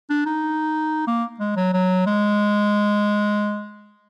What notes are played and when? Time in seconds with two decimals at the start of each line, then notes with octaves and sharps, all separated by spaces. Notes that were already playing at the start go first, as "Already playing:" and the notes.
0.10 D4
0.26 D#4
1.07 A#3
1.40 G#3
1.57 F#3
1.73 F#3
2.06 G#3